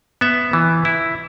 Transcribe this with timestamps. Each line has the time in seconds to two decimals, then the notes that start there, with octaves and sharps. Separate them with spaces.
0.21 B3 E5
0.53 E3
0.85 E4